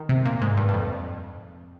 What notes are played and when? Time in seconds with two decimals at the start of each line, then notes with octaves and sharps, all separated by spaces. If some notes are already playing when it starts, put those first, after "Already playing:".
Already playing: D#3
0.09 C3
0.25 A#2
0.41 G#2
0.57 G2
0.69 G2
0.74 F2